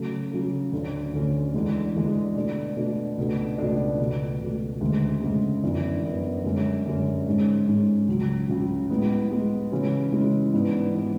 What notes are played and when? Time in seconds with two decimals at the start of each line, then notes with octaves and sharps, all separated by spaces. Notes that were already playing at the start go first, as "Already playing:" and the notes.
Already playing: C#3 F#3 A3
0.31 C#3 F#3 A3
0.72 D2 D3 A3 C#4
1.13 D2 D3 A3 C#4
1.54 E2 D3 G#3
1.95 E2 D3 G#3
2.36 B2 A3 D4
2.77 B2 A3 D4
3.17 C#2 B2 A3 D4
3.58 C#2 B2 A3 D4
4.00 C#2 B2 A3
4.40 C#2 B2 A3
4.81 D2 C#3 G#3
5.22 D2 C#3 G#3
5.63 F#2 E3 B3 D4
6.04 F#2 E3 B3 D4
6.45 F#2 D3 G#3 C#4
6.85 F#2 D3 G#3 C#4
7.26 G#2 G#3 C#4
7.67 G#2 G#3 C#4
8.08 C#2 C#3 F#3
8.49 C#2 C#3 F#3
8.90 A2 G#3 B3
9.31 A2 G#3 B3
9.72 C#3 E3 G#3 C#4 E4
10.12 C#3 E3 G#3 C#4 E4
10.53 G#2 E3 B3 D4
10.94 E3 B3 D4